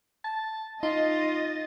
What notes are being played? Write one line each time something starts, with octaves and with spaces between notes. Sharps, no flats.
A5
D#4 F4 D#5 A6